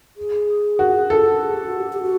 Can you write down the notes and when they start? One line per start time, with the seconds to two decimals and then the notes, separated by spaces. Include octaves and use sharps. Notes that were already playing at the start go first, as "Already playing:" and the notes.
0.17 G#4
0.79 F#4
1.10 A4
1.41 G#4
1.54 G4
1.67 F#4
1.80 G4
1.93 G4
2.03 F#4